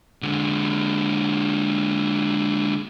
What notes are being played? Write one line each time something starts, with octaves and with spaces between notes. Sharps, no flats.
D3 G#3